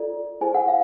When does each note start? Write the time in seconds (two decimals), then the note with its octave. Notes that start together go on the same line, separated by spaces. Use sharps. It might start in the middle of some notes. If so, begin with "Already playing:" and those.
Already playing: F4 A4 D5
0.41 E4 G#4 C5 G#5
0.54 F#5
0.68 F5